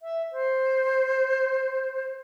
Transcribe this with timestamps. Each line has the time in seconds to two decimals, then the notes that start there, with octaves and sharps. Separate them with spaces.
0.01 E5
0.32 C5